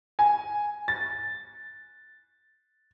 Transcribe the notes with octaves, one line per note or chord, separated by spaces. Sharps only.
G#5
A6